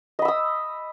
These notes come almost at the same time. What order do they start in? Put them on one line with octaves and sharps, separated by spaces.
D#5 B5 E6 D#6